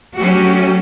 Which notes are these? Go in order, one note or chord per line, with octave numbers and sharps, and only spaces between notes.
F#3 A3 C#4 F#4 G4